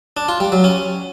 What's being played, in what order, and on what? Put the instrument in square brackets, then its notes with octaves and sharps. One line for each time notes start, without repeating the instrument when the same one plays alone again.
[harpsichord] D4
F4
G3
F#3
C#4